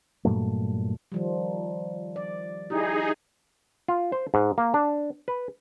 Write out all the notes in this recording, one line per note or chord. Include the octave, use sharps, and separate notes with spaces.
G2 A#2 F#3 A3
D#3 F3 G3
D5
D#4 E4 G4 G#4
F4
C5
G#2
A#3
D4
B4